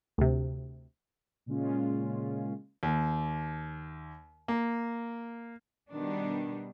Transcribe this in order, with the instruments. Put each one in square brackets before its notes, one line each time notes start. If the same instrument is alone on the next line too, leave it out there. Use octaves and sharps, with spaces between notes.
[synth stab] D2 C3
[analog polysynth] A#2 C#3 G#3 C#4 F4
[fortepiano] D#2
A#3
[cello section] B2 D#3 G3 B3 D4